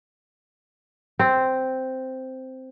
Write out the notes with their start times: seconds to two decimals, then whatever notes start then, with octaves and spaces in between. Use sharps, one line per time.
1.19 C4